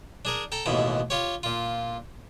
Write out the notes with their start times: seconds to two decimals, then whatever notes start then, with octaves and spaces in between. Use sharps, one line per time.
0.25 D4 G#4 A#4
0.52 A4 G5 A#5
0.66 A1 D#2 B2 E3 G5
1.10 F4 G4 C#5
1.43 A#2 F4